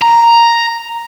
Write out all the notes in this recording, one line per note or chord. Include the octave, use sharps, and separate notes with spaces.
A#5